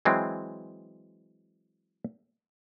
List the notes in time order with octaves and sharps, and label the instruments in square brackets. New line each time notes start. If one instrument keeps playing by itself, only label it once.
[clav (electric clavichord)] E3 F#3 G#3 C4